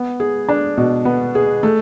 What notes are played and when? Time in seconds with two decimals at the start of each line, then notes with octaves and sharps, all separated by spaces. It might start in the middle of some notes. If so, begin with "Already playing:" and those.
Already playing: B3
0.20 G#4
0.49 D4
0.77 B2
1.05 B3
1.35 G#4
1.63 A3